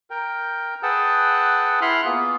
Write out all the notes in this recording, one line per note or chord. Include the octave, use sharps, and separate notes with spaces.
A#4 G5
G#4 B4 F#5 G5 A5 E6
E4 F#5 B5 C6 F6 F#6
A#3 B3 F4 G#4